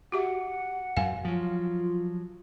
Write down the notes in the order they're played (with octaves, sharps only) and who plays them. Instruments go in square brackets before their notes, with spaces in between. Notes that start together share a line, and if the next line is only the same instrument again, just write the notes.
[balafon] F#4 G4 E5 [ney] F#5
[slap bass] F#2 [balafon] F5 G#5
[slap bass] F3 F#3 [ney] F4